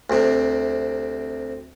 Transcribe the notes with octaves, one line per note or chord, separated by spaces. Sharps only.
D2 C3